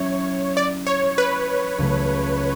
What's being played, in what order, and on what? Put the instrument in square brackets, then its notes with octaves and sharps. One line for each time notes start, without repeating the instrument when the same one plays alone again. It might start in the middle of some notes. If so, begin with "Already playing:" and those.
Already playing: [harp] F#3 C#4 E4 [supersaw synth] C#5
[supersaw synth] D5
C#5
B4
[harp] C#2 C#3 F#3 A3